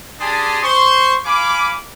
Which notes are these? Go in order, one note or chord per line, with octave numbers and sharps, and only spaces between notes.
D4 G4 G#4 A5 C6 D#6
C5 C6 C#6
F5 G#5 B5 D6